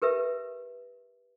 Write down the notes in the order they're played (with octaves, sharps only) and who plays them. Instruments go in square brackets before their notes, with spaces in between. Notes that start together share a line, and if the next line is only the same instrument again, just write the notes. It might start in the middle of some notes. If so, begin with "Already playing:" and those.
[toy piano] G4 A#4 B4 E5